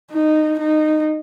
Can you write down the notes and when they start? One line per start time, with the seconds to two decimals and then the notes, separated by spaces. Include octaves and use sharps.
0.11 D#4
0.59 D#4